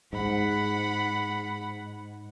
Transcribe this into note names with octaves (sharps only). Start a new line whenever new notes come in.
G#2 F#5 B5